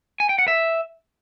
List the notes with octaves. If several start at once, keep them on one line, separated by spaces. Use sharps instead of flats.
G#5
G5
F#5
E5